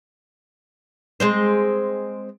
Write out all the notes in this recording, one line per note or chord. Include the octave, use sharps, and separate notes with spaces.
G#3 C4 C5